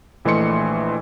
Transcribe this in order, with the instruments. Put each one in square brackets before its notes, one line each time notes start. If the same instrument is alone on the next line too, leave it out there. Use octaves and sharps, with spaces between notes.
[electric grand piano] A#1 E3 A3 D#5 C6 C#7